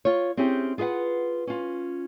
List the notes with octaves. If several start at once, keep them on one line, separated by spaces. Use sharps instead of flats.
F4 C#5
C4 C#4 E4 G4 G#4
F4 G#4 B4 F5 F#5
C#4 F4